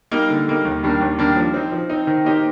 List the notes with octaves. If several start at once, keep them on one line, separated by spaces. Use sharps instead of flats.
G3 A#3 D#4
D3
G3 A#3 D#4
D#2
D#3 G3 A#3 D4
D#2
D#3 G3 A#3 D4
F3
C4 D#4
F3
C4 D#4
D#3
A#3 D#4 G4 C5